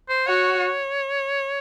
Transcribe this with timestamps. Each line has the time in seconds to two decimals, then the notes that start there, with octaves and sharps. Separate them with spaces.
0.09 C5
0.27 F#4 C#5